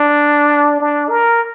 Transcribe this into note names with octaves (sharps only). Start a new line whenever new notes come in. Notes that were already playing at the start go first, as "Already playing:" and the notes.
Already playing: D4
D4
A#4